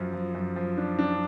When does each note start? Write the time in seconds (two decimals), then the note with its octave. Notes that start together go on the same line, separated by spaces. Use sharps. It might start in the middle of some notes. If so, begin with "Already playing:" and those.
Already playing: F#2 F3
0.13 F3
0.35 F#2
0.56 F3
0.78 D4
0.99 D4